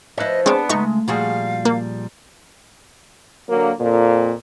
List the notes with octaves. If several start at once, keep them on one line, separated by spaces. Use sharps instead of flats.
F3 E4 B4 C#5 D#5
G#3 B3 C4 D4 C#5 D5 A5
C#3 G#3 A3 D#4 C#6
A#2 F3 G3 F4 F#4 G#4 F5
A#3
D3 F#3 A#3
F2 A#2